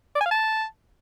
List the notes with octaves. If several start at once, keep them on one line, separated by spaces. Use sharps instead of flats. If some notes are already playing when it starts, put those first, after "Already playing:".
D5
G#5
F5
A5